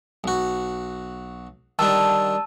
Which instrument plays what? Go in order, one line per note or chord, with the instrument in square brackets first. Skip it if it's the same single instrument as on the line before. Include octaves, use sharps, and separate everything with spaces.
[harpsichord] B1 F#4
[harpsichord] D#3 G3 D4 [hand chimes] A5 E6